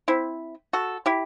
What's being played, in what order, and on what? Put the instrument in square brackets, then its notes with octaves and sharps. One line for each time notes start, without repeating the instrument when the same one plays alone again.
[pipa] C4 E4
F#4 A4
E4 G4